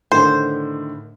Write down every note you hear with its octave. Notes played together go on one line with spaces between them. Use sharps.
A2 D3 D#3 C5